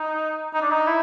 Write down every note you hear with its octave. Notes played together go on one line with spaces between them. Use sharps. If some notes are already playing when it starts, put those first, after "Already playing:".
Already playing: D#4
D#4
D4
D#4
E4